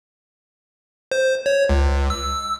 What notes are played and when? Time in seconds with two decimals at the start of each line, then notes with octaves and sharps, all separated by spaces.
1.11 C5
1.46 C#5
1.69 C#2
2.10 E6